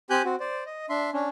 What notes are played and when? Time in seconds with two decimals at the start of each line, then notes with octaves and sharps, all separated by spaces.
0.10 C4 G4 G#5 F#6 G6
0.24 C4 F#4
0.40 C5 D5
0.66 D#5
0.89 D4 E5 C6
1.13 C#4 D4